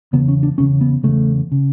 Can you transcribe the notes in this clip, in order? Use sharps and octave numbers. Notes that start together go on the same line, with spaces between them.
E2 C#3 B3
C#4
D4
E2 C#3 C#4
B3
E2 C#3 A3
C#3